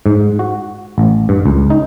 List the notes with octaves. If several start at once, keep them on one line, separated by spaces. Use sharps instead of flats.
G#2
F#4
A1
G2
C#2
D#4